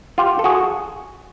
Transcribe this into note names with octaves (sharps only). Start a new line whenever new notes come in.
F4 G4
A4
F#4 G#4